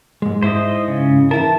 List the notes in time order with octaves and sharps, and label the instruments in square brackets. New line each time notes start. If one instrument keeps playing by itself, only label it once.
[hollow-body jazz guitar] G#2 G#3
[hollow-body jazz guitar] G#2 E4 [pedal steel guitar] C5 D#5
[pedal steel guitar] C#3
[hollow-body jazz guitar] E3 E4 A#4 [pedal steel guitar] A5